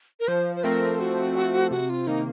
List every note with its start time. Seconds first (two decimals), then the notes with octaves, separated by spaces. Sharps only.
0.20 A#4
0.28 F3 C5
0.56 C5
0.63 A3 C4 A#4
0.99 F3 F#4
1.35 A3 C4
1.71 C3 F#4
1.90 F4
2.07 D#3 A#3 D#4